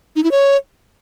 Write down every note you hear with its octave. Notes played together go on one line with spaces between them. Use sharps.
D#4
E4
C#5